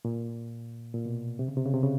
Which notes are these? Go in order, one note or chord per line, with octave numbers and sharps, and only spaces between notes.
A#2
A#2
B2
C3
C#3
C3
C#3
C3
C#3